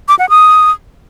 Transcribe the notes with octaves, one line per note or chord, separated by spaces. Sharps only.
D6
F#5
D#6